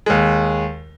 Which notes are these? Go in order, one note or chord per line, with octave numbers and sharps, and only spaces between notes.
D#2 G#3